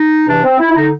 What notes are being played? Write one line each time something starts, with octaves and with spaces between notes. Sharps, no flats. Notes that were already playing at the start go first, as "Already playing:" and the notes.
Already playing: D#4
E2 C3 E3 D4
C4
E4
E4
D3 D#4